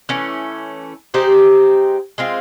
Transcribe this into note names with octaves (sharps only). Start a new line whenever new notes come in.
E3 A3 C#4
G#3 C4 D#4 G4
G#3 C4 F4